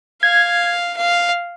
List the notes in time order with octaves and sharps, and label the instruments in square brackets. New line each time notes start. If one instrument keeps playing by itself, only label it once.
[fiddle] F5 [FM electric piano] G#6
[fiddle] F5